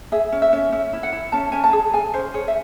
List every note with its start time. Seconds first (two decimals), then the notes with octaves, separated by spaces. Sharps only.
0.12 G#4 E5
0.32 C#4
0.42 E5
0.53 C#4
0.72 C#4 E5
0.93 E4
1.03 F#5
1.12 E4
1.32 C#4 A5
1.52 C#4 G#5
1.64 A5
1.73 G#4
1.93 G#4 G#5
2.14 C#4 C5
2.34 G#4 C#5
2.48 E5